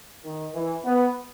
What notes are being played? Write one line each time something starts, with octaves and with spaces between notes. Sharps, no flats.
D#3
E3
B3